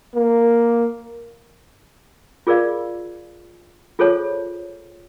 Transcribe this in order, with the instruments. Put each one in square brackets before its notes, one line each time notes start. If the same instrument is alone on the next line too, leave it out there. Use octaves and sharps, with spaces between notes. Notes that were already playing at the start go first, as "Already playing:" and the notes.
[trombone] A#3
[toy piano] F4 G#4 A#4 D5 F5
F4 G#4 A4 C5 C#5 A5